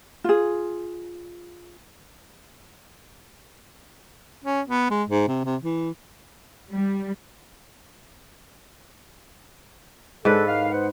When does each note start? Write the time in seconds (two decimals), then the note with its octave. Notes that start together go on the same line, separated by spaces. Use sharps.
0.24 F4 G#4
4.44 C#4
4.68 B3
4.91 G#3
5.09 G#2
5.28 C3
5.45 C3
5.63 E3
6.72 G3
10.25 G#2 D3 A4 B4
10.48 A2 D#3 F5
10.71 B3 C5 F#5